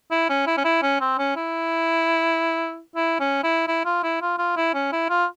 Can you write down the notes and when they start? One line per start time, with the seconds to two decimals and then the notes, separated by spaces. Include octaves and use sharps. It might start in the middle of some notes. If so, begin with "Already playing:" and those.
0.11 E4
0.29 C#4
0.47 E4
0.57 C#4
0.65 E4
0.82 C#4
1.00 C4
1.19 C#4
1.36 E4
2.96 E4
3.20 C#4
3.44 E4
3.67 E4
3.85 F4
4.03 E4
4.22 F4
4.38 F4
4.57 E4
4.74 C#4
4.92 E4
5.09 F4